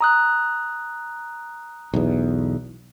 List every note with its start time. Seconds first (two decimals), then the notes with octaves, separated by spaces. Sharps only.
0.01 A#5 D#6 F#6
1.94 B1 E2